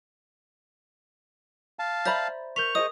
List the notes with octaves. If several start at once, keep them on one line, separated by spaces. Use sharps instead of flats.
F5 A5
C5 D5 E5 A#5 B5 A6
A#4 C#6 G6 B6 F7
G#4 C5 D#5 D#6